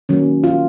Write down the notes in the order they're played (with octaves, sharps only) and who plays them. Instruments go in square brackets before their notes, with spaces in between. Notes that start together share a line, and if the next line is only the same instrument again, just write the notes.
[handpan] D#3 F#3 A#3 C#4
F4